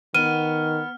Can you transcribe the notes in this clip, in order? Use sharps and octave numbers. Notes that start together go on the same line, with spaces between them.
D#3 B3 F6 D#7